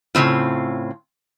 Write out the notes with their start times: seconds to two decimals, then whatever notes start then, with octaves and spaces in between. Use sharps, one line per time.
0.15 A2 C#3 C4 F4